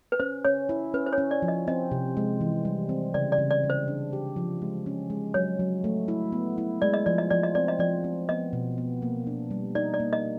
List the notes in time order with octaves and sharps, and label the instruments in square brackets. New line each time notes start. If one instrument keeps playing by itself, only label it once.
[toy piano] B4
[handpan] C#4 [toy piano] C5
[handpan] C#4 [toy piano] C#5
[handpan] E4
[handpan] C#4 [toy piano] B4
[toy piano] C5
C#5
[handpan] C#4
[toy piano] D5
[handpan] F3
[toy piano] D#5
[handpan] C4 [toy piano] D#5
[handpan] C3
G#3
E3
G3
C4
[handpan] C#3 [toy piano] D5
[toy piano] D5
[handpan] C#3
[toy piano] D5
[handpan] C#3
[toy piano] C5
[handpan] D4
G4
F3
G#3
C#4
G#3
[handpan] F#3 [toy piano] C#5
[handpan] F#3
A3
E4
B3
E4
[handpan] G#3 [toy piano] D5
[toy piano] D#5
[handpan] F3 [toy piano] D5
[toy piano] D#5
[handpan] F3 [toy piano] D5
[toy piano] D#5
[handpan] C4 [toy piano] D5
[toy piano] D#5
[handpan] F3 [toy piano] D5
[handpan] C4
[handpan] B3 [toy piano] D#5
[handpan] B2
B3
A#3
D4
G3
[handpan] D#4 [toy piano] D5
[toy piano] D5
[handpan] A#3
[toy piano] D#5